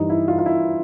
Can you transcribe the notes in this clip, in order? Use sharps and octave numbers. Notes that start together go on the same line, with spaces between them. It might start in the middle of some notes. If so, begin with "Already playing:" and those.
Already playing: G2 E3 G3 D#4
E4
F4
F4
E4